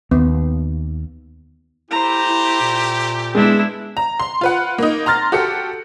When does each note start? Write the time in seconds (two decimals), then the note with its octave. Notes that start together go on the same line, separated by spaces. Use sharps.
0.11 D#2 B3
1.91 A3 E4 G4 C5 A#5
2.29 E4
2.62 A#2
3.35 G#3 B3 D4 E4
3.97 A#5
4.20 C6
4.41 F4 B4 F#5
4.78 A#3 D#4
5.06 A#5 C6 F6 A6 A#6
5.32 F#4 G4 A4 C#7